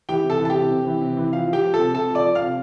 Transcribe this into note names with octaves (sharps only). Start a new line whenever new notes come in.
E3 G4 G5
C3
A4 A5
E3
A5
G4 G5
C3
C3
E3
C3
E3
F3 F5
F3
G4 G5
F3
A4 A5
C3
C3 A4 A5
F3
D5 D6
F3
F5 F6
C3